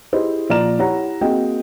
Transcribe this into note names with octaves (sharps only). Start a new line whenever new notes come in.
E4 G4 G#4 C5 D#5
A#2 F3 D5 A#5 F6 E7
E4 G4 C#5 F#5 A#5
A#3 C4 F#4 G#4 D#5 G5